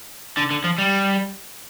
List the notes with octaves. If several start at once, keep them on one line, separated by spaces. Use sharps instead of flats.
D3
D3
F3
G3